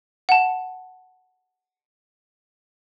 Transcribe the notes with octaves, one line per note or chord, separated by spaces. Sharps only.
F#5 A5